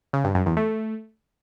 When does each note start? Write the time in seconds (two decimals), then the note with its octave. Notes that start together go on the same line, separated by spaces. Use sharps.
0.13 C#3
0.24 G2
0.35 F#2
0.46 E2
0.57 A3